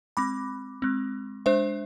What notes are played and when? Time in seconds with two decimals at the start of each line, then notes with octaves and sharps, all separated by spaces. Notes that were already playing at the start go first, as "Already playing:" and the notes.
0.17 G#3 C4 B5 D6
0.82 G#3 C4
1.46 G#3 D4 C5 E5